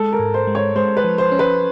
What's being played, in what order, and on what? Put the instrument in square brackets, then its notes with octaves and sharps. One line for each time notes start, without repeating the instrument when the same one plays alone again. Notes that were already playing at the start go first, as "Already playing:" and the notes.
Already playing: [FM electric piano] G#3 [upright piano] A4
[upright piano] A#4
[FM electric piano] G#2
[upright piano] C5
[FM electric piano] G#3
[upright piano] C#5
[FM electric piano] G#3 [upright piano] C5
[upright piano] B4
[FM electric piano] F3
[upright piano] C5
[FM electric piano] C#4
[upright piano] B4